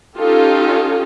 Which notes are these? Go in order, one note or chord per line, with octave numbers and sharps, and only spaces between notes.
C#4 D#4 F4 G4 A4